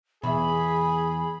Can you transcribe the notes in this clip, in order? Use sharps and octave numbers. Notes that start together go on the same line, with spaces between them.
E2 B2 G#4 E5 B5